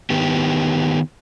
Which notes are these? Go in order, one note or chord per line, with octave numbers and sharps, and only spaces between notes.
D#3 B3 G4